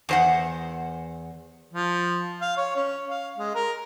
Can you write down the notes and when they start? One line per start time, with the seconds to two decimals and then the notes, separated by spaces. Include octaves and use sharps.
0.09 E2 C5 F#5
1.73 F3
2.42 F5
2.57 C#5
2.76 C#4
3.09 F5
3.38 G#3
3.55 A#4